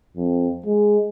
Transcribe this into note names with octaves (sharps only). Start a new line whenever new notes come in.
F2
G#3